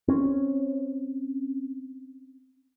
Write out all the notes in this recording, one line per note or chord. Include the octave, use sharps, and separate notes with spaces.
C4 C#4